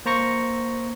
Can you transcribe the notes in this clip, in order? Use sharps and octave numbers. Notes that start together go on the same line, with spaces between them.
A#3 C5 A#5 C#6 A#6 C#7